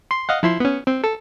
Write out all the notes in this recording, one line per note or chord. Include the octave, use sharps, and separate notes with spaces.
C6
D#5 F5 F#5
F3 E4 C6
B3 C#4
C4
A4